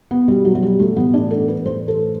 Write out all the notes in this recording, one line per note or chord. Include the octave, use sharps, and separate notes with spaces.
B3
B2 G3
F#3
F#3
G3
A3
A2 E3 B3
D4
A4
B4
A2 E3 C5
A4